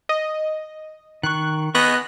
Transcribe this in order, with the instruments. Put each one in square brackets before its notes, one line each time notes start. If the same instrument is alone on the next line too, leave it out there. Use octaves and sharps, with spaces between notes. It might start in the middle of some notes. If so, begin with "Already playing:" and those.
[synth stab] D#5
[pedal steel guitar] D#3 C#6 [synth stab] F#6
[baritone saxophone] B3 [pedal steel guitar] G#4 D#5 C#6 [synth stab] F#6 A#6